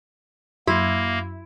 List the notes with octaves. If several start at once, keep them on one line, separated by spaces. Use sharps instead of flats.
F#2 A#3 E4 F#4